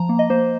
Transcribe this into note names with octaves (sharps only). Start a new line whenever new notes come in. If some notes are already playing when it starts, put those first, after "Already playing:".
Already playing: F3 A#5
A#3
D#5
A#3 C5